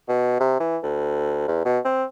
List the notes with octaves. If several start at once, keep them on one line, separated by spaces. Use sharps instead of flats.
B2
C3
E3
D2
E2
B2
C4